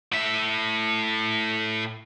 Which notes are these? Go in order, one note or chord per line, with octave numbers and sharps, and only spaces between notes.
A2 E5